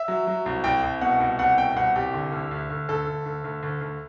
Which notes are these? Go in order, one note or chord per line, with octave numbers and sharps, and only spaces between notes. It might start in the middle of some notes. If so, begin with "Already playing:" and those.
Already playing: E5
F#3
F#3
C2
C2 G5
C2
B2 F#5
C2
C2 F#5
B2 G5
C2 F#5
C2 G4
D3
D2
D2
D2
D2 A4
D2
D2
D2
D2
D2